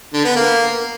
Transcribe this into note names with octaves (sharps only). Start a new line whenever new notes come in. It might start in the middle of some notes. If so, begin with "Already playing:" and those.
D3
B3
A#3